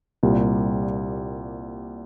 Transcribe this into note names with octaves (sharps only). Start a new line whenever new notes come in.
C2 A#2 G3